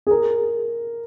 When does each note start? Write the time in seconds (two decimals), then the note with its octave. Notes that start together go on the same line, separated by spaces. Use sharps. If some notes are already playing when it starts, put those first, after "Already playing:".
0.07 G#4
0.11 A#4